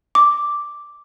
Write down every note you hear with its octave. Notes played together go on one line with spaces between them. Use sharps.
D6